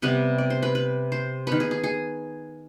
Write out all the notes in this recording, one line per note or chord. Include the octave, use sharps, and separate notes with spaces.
C3 G3 B3 B4
D5
C5
B4
B4
C5
D#3 B3 B4
G#4
G#4
G#4